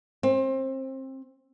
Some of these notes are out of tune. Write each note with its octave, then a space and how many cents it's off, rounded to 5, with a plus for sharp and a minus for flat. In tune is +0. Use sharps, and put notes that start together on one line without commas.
C4 +25